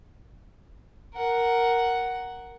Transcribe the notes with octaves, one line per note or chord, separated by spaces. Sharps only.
A#4 F#5